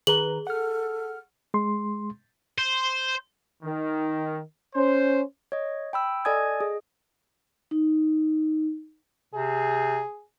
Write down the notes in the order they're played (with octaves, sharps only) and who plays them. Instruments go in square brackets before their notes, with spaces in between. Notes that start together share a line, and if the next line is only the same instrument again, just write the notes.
[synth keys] D#3 B4 A#5 [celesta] G#4 G7 [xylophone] F#7
[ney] A4 [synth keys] F#5 F6
[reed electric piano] G#3 C6
[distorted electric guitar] C5
[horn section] D#3
C#4 C5
[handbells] C#5 D#5
G5 B5 E6
A4 D5 D#5 G#5 D#6 G#6
G#4 D#5
[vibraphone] D#4
[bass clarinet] C3 [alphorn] G#4